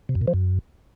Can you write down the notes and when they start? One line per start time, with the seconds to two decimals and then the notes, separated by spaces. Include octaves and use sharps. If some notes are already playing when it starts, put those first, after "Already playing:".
0.09 C3
0.15 F#2
0.21 A#2
0.28 F3
0.34 F#2